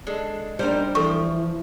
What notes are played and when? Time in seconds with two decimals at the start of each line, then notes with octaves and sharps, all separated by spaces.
0.07 G#3 D4 A4
0.59 G3 D4 D#4 A#4 C5
0.95 E3 F3 A4 C#6